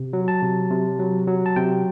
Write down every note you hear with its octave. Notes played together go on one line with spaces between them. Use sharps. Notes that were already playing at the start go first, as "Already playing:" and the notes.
Already playing: C3
F#3
A5
C3
C3
F#3
F#3
A5
C3 G5